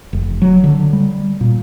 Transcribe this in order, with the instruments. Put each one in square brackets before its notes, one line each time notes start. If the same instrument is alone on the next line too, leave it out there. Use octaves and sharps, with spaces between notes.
[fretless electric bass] F1
F#3
D3
G3
A#2